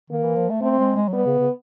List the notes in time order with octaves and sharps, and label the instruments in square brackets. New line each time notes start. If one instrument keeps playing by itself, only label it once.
[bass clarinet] D#3 [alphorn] A#3
[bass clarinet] E3
F3
A3
[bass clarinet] A3 [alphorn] C4
[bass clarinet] G#3
G#3
F#3
[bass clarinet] G3 [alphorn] B3
[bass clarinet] C#3
C#3